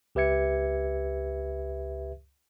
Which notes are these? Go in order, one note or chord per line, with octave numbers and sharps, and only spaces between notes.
C#2 G4 B4 E5 G#6 C#7